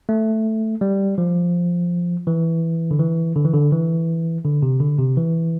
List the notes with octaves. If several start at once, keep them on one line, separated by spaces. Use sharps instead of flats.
A3
G3
F3
E3
D3
E3
D3
E3
D3
E3
D3
C3
D3
C3
E3